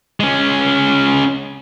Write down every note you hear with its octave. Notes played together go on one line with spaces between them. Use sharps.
G#3 C#4